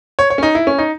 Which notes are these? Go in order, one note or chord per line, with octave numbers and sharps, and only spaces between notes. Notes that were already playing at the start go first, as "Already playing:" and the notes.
C#5
C#5
C#4
D#4
E4
C#4
D#4